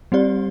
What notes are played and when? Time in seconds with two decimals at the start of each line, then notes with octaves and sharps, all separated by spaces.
0.12 G3 C4 G4 D5